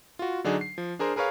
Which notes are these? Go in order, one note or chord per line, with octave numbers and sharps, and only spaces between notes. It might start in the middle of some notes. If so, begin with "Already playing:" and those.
F4 F#4
D3 F#3 D4 D#4 G#4
C7
F3
D4 G#4 A#4 C5
G#4 A#4 B4 C#5 F5